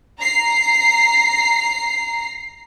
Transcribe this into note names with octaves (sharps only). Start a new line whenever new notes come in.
A#5 C7